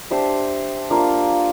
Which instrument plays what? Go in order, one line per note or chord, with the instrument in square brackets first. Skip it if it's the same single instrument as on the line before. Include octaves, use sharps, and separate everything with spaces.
[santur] D4 G4 C5 E5
A#3 D4 F4